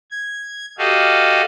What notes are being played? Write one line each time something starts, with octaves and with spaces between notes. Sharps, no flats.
G#6
F#4 G4 A4 D#5 F5